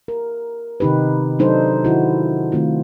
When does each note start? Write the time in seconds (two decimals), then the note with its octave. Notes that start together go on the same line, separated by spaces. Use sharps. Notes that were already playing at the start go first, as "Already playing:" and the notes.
0.08 A#4
0.80 C3 D#3 D#4 G4 B4
1.39 F#3 D4 D#4 A4 C5
1.85 D#3 E4 F#4
2.52 D#3 A3 C4 F4